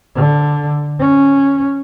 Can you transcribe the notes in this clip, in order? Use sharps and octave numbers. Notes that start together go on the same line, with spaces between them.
D3
C#4